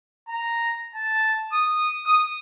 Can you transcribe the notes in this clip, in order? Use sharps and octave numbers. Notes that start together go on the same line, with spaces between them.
A#5
A5
D#6
D#6